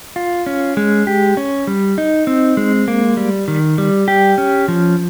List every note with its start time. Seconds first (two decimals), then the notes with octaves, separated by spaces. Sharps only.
0.16 F4
0.46 C#4
0.77 G#3
1.07 G4
1.37 C#4
1.67 G3
1.98 D#4
2.27 C4
2.57 G#3
2.88 A#3
3.17 G3
3.48 D#3
3.78 G3
4.08 G4
4.38 C#4
4.68 F3